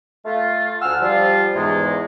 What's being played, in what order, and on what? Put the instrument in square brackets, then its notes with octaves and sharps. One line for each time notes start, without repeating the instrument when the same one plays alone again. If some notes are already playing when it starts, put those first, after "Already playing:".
[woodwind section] A3 F4
D2 F#5 G#5 E6 F6
F3 G3 F4
E2 G#2 G#3